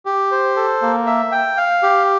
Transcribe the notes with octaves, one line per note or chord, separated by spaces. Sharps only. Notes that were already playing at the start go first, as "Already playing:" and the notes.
G4
C5
A4
A#3
E5
G5
F5
G4